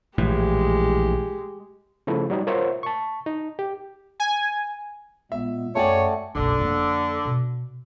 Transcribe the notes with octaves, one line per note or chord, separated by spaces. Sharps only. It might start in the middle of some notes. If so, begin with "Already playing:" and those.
A#1 A2 E3 G#3 G4
C#3 F3 A3 E4
F#3 G3 D#4
F4 A#4 C5 C#5 E5 F#5
A5 C#6
D#4
G4
G#5
A#2 G#3 B3 E5
F#2 A3 F#4 C#5 D5 G5 G#5 C#6
F#1 B1 D3
F2 A#3
B2